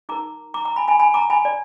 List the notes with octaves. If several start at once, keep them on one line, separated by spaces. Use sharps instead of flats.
D#4 A#4 A#5 D6
A#5 D6
A#5 D6
G#5 B5
G#5 B5
G#5 B5
A#5 D6
G#5 B5
D5